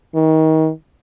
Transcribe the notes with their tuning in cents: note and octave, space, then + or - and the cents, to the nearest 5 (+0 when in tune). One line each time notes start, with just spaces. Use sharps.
D#3 +30